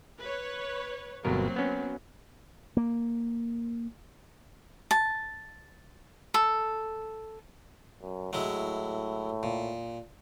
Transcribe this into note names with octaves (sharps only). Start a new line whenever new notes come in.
B4 C#5
G1 B2 F#3 A#3 C4 A#4
B3 C#4
A#3
A5
A4
F#2
A2 F#3 G#3 E4
A#2